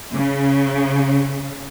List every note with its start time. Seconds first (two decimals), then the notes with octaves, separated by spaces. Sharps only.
0.12 C#3